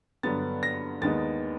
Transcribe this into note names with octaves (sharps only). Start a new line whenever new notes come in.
G2 D3 F#3 B3 A6
A#6
D#2 D#3 G#3 B3 D#4 A6